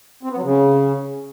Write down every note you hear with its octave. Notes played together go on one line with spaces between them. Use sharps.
C4
B3
F#3
C#3